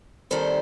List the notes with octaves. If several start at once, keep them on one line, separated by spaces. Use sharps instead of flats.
D#2 D#3 G3 C4 A4 C5